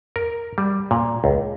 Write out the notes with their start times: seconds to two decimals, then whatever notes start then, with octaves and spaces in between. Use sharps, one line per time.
0.16 A#4
0.58 G3
0.91 A#2
1.24 C#2